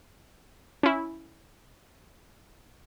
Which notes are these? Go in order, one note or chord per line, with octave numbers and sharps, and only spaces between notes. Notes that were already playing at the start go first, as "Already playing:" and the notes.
C#4 E4